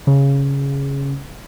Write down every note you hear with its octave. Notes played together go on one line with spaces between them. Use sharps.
C#3